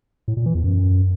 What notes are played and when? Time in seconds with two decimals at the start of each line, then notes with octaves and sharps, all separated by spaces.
0.28 A2
0.37 A#2
0.46 E3
0.55 E2
0.64 F#2